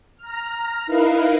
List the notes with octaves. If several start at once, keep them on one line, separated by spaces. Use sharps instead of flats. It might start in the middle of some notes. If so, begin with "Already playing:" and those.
A#5 F6
D#4 E4 A#4 B4 F5